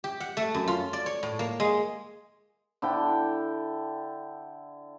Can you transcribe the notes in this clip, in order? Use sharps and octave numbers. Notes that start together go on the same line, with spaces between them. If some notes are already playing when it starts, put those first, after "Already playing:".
G4
F#5
A3
F#2
F4
D5
C#5
A2
A#3
G#3
D3 E4 G5